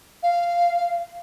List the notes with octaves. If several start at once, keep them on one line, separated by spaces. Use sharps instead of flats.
F5